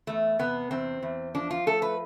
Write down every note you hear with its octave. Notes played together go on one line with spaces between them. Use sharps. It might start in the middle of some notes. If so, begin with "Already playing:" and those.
E2 A3
C3 B3
E2 C4
E2
F3 D4
F4
A3 A4
B4